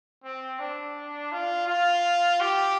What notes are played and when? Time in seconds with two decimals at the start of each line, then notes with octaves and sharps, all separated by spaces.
0.24 C4
0.59 D4
1.32 F4
1.68 F4
2.40 G4